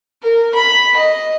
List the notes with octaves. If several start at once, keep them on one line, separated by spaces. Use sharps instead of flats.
A#4
B5
D#5